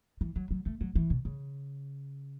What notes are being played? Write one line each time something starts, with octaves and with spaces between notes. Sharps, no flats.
E3
F#3
F#3
A3
F#3
E3
B2
C#3